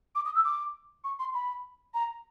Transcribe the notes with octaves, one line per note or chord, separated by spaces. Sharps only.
D6
D#6
E6
D6
C#6
C6
B5
A#5